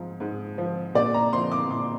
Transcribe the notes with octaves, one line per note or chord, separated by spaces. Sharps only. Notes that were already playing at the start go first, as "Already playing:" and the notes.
Already playing: G#2 F3
G#2
F3
A#2 D5
A#5
F3 C6
D6
A#2 C6